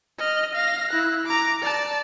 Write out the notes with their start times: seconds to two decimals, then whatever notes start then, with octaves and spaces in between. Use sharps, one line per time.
0.19 D#5 F6
0.55 F5 A#6
0.90 E4 F#6
1.26 A#5 D6
1.62 D5 A5